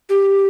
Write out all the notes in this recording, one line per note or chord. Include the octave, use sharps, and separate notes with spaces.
G4